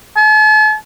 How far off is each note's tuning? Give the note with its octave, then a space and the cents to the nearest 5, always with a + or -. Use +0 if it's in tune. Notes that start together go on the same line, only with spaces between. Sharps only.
A5 -45